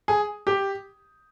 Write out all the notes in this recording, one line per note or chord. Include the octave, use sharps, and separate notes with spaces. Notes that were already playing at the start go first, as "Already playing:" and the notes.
G#4
G4